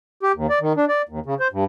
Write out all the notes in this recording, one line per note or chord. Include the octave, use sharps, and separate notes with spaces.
G4
D#2
D5
D#3
D4
D5
D#2
C#3
C5
G2